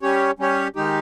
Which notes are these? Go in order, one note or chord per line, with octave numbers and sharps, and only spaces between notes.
G3 C#4 G4 C#5
G3 C#4 G4 C#5
D#3 G#3 D#4 G4